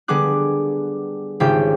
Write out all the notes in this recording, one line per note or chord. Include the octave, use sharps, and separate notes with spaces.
D3 G3 B3 G#4 D6 F#6
G#1 C#3 F4 G4 G5